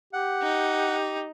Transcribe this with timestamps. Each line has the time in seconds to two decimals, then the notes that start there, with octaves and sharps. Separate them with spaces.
0.13 G4 F#5
0.42 D#4